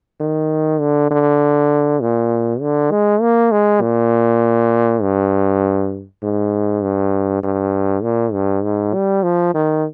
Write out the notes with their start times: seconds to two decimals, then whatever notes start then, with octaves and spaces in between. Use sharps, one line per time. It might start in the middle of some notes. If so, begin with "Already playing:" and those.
0.20 D#3
0.80 D3
1.11 D3
2.02 A#2
2.61 D3
2.91 G#3
3.21 A#3
3.51 G#3
3.82 A#2
5.02 G2
6.23 G#2
6.83 G2
7.43 G2
8.03 A#2
8.33 G2
8.64 G#2
8.94 G3
9.23 F3
9.54 D#3